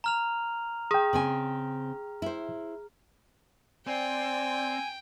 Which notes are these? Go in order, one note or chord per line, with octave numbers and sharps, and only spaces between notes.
A#5 F6 F7
G#4 G5 D#6
C#3 C4 G#5
E4 C5
C4 D5 G5 G#5